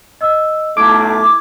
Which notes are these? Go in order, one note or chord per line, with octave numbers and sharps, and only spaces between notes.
D#5 E6
B1 A3 E4 D6 G#6